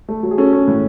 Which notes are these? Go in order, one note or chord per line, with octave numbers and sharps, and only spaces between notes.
A3
F#3
G#4
C#4 A4
C#4
A2